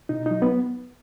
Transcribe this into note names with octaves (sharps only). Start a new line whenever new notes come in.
B2 D#4
F#3 D#4
B3